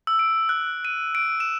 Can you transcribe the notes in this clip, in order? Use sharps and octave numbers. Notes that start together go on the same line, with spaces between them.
E6
D7
F#6
D#7
D7
E7